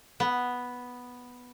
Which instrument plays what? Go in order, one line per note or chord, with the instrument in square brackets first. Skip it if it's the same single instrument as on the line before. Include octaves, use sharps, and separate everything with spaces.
[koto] B3